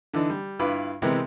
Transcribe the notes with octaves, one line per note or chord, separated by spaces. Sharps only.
D3 E3 D4 D#4
G3
G2 E4 F4 B4 B5 D6
C3 E3 G#3 B3 C4 A#4